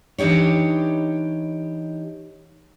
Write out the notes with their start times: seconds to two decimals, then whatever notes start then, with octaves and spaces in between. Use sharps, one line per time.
0.18 E3 D4 D#4 G4 C#5